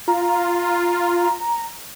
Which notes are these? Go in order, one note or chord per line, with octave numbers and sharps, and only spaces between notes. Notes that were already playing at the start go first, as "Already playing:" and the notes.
F4 A#5